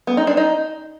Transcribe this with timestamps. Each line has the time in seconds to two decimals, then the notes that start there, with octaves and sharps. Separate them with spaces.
0.07 B3
0.17 D#4
0.27 D4
0.37 D#4